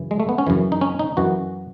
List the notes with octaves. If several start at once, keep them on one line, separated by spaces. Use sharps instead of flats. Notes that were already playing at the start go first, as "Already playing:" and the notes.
Already playing: F#2 C#3 E3
G#3
A3
B3
C#4
F#2 C#3 E3
D#4
C#4
D#4
F#2 E3 F#4